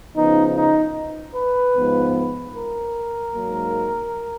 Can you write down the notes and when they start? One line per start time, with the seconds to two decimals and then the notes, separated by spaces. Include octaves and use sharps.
0.16 C#3 F3 B3 D#4
0.56 D#4
1.36 B4
1.75 G#2 F3 B3
2.55 A#4
3.34 G#2 F#3 A#3